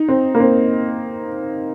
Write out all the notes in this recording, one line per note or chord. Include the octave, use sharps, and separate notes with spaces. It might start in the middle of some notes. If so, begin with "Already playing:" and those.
Already playing: D#4
C4
A#3
C4